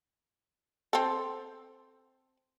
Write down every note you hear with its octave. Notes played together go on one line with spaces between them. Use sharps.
C4 A4